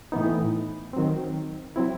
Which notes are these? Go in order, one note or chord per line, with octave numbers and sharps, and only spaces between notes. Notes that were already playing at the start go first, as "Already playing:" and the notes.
A2 E3 B3 D#4
D#3 F#3 C4
F#3 C4 E4